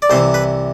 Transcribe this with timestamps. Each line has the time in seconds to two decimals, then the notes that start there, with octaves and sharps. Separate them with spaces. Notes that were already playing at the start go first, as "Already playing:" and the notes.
0.02 D5
0.10 C2 C3 E3 C5
0.34 B4